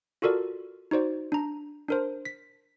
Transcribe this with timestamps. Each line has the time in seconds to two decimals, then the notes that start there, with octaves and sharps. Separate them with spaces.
0.22 F4 F#4 A4 A#4 D5
0.91 D#4 F#4 C5 D5
1.32 D4 A#5
1.88 D4 A#4 C5
2.25 B6